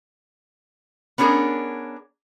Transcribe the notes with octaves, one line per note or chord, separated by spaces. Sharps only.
B3 C#4 D4 G#4 A#4